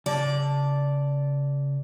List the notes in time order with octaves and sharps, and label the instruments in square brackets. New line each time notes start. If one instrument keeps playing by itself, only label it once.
[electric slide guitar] C#3 A5 [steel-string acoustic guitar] D5